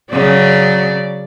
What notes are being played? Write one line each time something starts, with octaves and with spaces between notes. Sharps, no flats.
C#3 F#3 D5